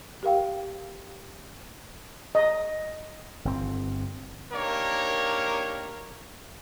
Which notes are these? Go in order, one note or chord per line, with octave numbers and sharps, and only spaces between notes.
G4 A#4 F5 G5
D#5
G1 C4
A#3 D4 D#4 G4 A#4 C#5